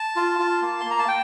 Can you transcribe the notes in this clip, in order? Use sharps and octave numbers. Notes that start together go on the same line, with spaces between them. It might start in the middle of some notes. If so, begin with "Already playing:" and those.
Already playing: A5
F4
F4
A#3
C6
A#3 A#5
A5
G5